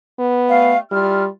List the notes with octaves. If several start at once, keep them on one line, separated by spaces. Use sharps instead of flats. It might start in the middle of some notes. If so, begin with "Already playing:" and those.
B3
G3 A3 F5
G3 E4 F4 F6